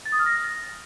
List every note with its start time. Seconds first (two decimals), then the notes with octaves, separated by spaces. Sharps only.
0.06 A6
0.12 D#6
0.19 F6
0.26 A#6